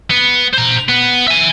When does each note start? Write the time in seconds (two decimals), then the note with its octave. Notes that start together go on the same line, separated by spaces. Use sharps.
0.10 B3
0.54 C5 A#5
0.89 B3
1.28 E5 G#5